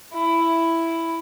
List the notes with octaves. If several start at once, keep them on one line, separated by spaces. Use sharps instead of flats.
E4